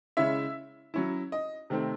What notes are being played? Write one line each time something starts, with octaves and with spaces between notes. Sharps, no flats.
C#3 G#3 C#4 E4 E5
F#3 C#4 E4
D#5
C3 D#3 A3 C4